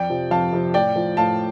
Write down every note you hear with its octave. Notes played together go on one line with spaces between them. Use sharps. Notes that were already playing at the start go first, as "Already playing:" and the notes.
Already playing: F2 D5 G5
C3 F3
F2 F5 A5
C3 F3
A2 D5 G5
F3
A2 F5 A5